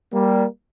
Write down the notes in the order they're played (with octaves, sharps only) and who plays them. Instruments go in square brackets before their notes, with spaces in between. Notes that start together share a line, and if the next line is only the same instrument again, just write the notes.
[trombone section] G3 A#3